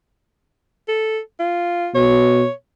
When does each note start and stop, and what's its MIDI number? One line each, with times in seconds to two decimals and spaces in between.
0.88 1.20 69
1.39 1.89 65
1.95 2.44 47
1.95 2.52 73